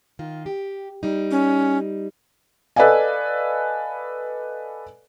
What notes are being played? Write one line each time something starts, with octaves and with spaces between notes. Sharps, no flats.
D#3 F4
G4
G3 D#4
C#4
A4 B4 D5 D#5 F5 G#5